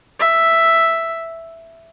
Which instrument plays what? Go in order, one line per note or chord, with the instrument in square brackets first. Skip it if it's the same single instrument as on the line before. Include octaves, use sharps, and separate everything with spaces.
[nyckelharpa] E5